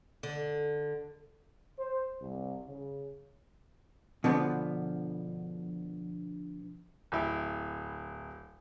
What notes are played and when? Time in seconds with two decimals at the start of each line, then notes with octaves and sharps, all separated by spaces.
0.23 D3
1.78 C5
2.21 C2
2.67 C#3
4.24 B2 D3 F3 B3
7.12 D1 E4